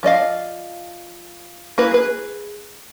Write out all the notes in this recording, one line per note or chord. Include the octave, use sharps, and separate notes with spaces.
F3 D5 D#5 F5
A#3 E4 B4
G#4 B4